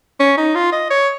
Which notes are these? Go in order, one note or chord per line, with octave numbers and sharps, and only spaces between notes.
C#4
D#4
F4
D#5
C#5